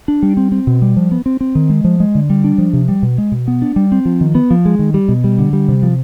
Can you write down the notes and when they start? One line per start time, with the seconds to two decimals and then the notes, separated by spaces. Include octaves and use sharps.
0.08 D4
0.23 G3
0.37 C4
0.52 C4
0.67 B2
0.82 G3
0.96 F3
1.12 B3
1.26 C4
1.41 C4
1.55 D#3
1.70 G#3
1.84 F3
2.00 G#3
2.15 D3
2.30 G3
2.44 D4
2.58 F3
2.73 C3
2.89 G3
3.03 B2
3.18 G#3
3.32 B2
3.48 B3
3.62 D4
3.76 G3
3.92 C4
4.05 F3
4.21 D#3
4.35 B3
4.51 F3
4.65 G#3
4.79 D#3
4.94 G3
5.09 B2
5.24 G3
5.38 D3
5.53 G3
5.69 C3
5.83 F3